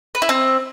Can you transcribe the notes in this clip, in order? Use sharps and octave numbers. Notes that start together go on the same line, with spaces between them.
B4
E4
C4